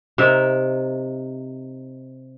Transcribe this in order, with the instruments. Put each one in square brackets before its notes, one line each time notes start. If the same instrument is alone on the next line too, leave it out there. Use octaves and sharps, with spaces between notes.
[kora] C3 D#4 A#4 E5